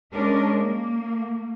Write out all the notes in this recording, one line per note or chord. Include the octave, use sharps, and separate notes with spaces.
G#3 C#4 D4 A#4
A#3